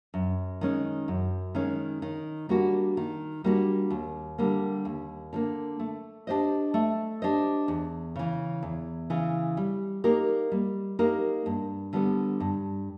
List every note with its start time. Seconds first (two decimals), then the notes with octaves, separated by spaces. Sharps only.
0.14 F#2
0.61 D#3 G#3 C#4
1.08 F#2
1.55 D#3 G#3 C#4
2.02 D#3
2.49 G3 A#3 D4 F#4
2.97 D#3
3.44 G3 A#3 D4 F#4
3.90 D#2
4.38 D3 G3 A#3
4.85 D#2
5.33 D3 G3 A#3
5.80 A3
6.27 D4 G4 C5 D#5
6.74 A3
7.22 D4 G4 C5 D#5
7.68 E2
8.16 C#3 E3
8.63 E2
9.10 C#3 E3
9.57 G3
10.04 A#3 D#4 G4 A#4
10.52 G3
10.99 A#3 D#4 G4 A#4
11.46 G2
11.93 D3 G3 B3
12.40 G2